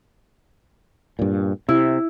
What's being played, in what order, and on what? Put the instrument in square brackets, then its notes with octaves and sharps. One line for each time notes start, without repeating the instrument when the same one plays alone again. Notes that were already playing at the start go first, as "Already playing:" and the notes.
[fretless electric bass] G2 A#2
[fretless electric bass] C3 [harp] E4